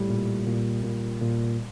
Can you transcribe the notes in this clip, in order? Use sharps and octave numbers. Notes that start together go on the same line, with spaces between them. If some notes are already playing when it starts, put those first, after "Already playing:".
Already playing: A2 G3
A#2
A#2
A#2
A#2